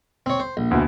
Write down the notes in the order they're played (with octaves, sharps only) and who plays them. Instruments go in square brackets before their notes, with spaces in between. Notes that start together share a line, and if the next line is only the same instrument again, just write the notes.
[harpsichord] C4 C#5
C5
A#1
[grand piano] D2 B2